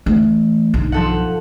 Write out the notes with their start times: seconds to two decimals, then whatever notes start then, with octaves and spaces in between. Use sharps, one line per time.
0.06 E3 A3
0.74 B1 G2
0.92 F3 A4 F#5